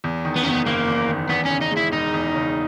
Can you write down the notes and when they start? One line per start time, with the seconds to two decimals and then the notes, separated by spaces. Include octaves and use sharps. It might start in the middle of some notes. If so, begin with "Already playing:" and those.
0.04 E2
0.25 D#3
0.36 B3
0.43 F#1 C#4
0.50 B3
0.66 F#1 A#3
0.88 E2
1.09 D#3
1.29 E2 B3
1.45 C#4
1.50 C#3
1.61 D#4
1.71 G#3
1.77 E4
1.92 E1 D#4
2.14 E2
2.34 C#3